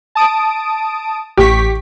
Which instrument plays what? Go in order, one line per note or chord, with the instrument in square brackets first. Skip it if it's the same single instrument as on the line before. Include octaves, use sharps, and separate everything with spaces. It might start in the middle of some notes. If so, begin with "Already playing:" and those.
[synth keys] A5 D#6 D7
[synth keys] A1 C#6 B6 [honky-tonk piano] G4